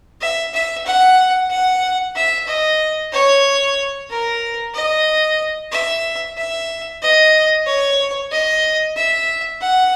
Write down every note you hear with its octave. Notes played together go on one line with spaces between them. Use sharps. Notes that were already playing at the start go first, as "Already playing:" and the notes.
E5
E5
F#5
F#5
E5
D#5
C#5
A#4
D#5
E5
E5
D#5
C#5
D#5
E5
F#5